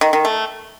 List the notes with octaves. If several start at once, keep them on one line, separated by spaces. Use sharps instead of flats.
D#3
D#3
A3